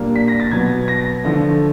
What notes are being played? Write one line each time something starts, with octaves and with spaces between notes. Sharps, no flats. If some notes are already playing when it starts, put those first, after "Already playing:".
Already playing: A#2 G3 A#3 D4
B6
A#6
A6
B2 F#3 B3 G#6
A#6
D3 F3 A3